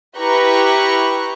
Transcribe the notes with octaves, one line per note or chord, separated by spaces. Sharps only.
E4 G4 B4 A#5 C#6 F#6